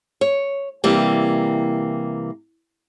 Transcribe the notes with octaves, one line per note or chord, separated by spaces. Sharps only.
C#5
C3 E3 G3 A#3